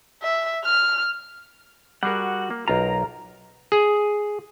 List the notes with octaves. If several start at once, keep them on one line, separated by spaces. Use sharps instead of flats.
E5
F6
G3 F#4 G#4 A#4 F#5
A#3
B1 F4 A#4 A#5
G#4